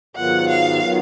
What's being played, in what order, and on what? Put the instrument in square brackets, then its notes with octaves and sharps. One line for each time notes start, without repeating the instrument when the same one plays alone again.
[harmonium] G#2 D#3 F#3 B3 F4 [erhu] F#5
[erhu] F5
[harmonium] D#3 F#3 B3 F4